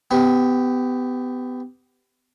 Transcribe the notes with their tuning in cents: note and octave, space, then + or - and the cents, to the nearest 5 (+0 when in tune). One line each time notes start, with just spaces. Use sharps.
B3 +25 G4 +0